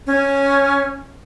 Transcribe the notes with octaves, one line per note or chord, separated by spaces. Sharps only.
C#4